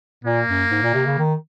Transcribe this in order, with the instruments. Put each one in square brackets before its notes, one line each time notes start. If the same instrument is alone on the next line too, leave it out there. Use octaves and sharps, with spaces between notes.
[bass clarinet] A#2 [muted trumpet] A#3
[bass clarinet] F#2
G#2
A#2
C3
C#3
D#3